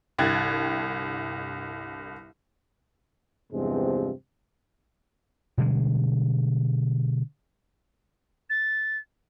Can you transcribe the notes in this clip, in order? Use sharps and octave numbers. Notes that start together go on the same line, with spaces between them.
G1 C2 G5 F#6 G#6 A6
E2 G2 C3 F3 G#3 C4
B2 D3 G3 G#3
A6